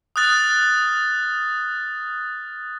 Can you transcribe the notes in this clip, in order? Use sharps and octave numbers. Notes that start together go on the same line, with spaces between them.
D#6 F6 F#6 A6